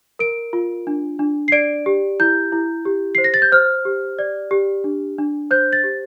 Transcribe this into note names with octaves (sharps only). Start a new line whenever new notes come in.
A#4 D7
F4
D4
D4
C7
D5 D7
G4
E4 G6
E4
G4
C5 C7
A#6
A6
G6
C5 F6
G4
D5
G4
D4
D4
C5 G6
A6
G4